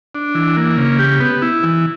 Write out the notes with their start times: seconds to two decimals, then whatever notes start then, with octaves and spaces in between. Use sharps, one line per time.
0.15 D4
0.35 E3
0.57 A#3
0.77 C#3
0.99 G4
1.20 B3
1.42 E4
1.63 E3